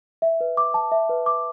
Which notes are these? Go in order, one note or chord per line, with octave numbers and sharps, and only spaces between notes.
E5
B4
D6
A5
E5
B4
D6